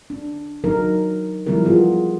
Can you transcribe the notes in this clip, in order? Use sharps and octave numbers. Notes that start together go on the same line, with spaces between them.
D4
F#3 D#4 A#4
E3 F3 G3 B3 E4 A#4
B3 F4 G#4